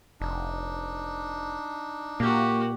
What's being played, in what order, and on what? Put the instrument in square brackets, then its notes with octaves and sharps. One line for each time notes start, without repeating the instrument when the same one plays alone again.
[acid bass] F1 [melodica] D4 D#4
[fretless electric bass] A#2 [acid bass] A#3 [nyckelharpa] F#4 G4